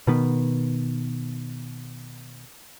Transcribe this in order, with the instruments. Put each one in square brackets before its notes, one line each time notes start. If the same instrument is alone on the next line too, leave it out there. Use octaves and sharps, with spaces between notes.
[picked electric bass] B2 D#3 B3